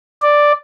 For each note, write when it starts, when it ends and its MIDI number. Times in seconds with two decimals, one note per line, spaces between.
0.22 0.52 74